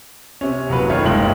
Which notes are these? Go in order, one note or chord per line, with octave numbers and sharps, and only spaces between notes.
C3 C#4
F#1 F#3 B4
D#3 A3 F4 C#5
F#1 B1 G#2 G5 F#7